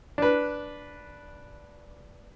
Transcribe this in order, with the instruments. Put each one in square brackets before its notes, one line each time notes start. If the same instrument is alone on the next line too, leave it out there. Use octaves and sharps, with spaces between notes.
[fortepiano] D4 B4